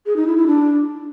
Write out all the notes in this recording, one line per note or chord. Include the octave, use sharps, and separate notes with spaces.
G#4
D#4
E4
E4
D4